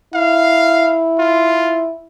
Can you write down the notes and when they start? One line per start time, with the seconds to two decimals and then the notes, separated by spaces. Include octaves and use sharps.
0.14 E4 F5
1.19 F4